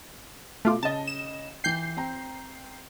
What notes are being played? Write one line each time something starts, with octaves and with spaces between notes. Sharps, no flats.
B2 A3 F4 D6
C#3 D#5 A5
E7
E3 G5 G6 C7
C4 G5 A#5